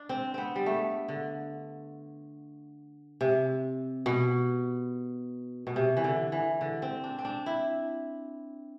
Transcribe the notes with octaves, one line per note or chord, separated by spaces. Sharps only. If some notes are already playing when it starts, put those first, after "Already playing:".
Already playing: D4
C4
B3 C4
G3
A3
D3
C3
B2
B2
C3
E3
D3
E3
D3
C4
D4
C4
D4
E4